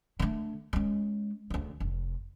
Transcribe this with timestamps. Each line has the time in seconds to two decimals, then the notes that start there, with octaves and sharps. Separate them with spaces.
0.19 D3 A3
0.73 G#3 C#4
1.50 D2 C#3
1.80 F1